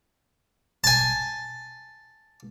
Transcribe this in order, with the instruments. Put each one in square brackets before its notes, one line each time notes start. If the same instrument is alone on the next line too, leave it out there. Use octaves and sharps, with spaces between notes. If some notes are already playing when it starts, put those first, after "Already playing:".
[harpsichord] G#5 A5